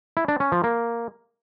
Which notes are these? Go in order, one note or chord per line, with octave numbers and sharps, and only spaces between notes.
E4
D4
C#4
F3
A#3